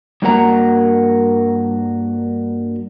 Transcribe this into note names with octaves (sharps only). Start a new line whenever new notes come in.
G2 A#3 F#4 A#4 F#5 A#5